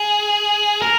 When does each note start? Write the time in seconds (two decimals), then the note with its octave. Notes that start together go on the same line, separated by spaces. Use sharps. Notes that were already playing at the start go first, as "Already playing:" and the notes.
Already playing: G#4
0.82 A#4